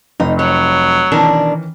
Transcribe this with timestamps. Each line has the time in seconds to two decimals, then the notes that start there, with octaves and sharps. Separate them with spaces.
0.20 F1 D#4
0.39 F#3 C#5
1.12 B2 D#3 E3 C#4 D4 A#4